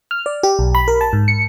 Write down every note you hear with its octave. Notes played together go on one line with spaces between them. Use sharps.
F6
D5
G4
B1
B5
A#4
A5
G#2
C#7